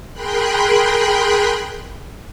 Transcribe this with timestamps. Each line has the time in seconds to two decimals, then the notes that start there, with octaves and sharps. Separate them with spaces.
0.13 G#4 A#4 G5 B5 C6 F#6